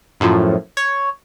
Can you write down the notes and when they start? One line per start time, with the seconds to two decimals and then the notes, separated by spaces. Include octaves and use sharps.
0.20 F#2 A2 F3
0.77 C#5